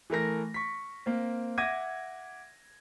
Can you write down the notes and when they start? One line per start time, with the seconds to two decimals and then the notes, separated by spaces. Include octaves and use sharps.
0.10 E3 A3 A#4 A#6
0.54 C#6 B6
1.06 A#3 C4
1.58 E5 F#5 D6 G#6 A#6 D#7